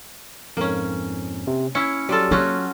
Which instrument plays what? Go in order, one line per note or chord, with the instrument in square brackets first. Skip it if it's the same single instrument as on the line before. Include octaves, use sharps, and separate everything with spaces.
[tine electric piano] F2 G#2 [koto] A#3 C#4
[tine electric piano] C3
[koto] C#4 E4 [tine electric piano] C#7
[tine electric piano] F#3 [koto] G3 F4 A4
[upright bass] A#3 [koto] C#4 F4 F#4